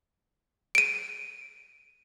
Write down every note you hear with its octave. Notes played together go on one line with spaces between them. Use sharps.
D7 D#7